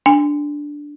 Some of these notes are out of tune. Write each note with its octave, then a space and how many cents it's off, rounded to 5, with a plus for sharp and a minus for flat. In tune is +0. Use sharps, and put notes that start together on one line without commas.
D4 +0 G#5 -30